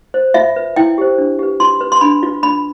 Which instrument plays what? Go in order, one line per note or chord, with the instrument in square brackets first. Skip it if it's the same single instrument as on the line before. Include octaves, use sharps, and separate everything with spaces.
[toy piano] C5
F4 E5
B4
E4 G5
G4 C5
D4
G4 B4
F4 C6
B4
C6
D4 B5
F4 B4
D4 B5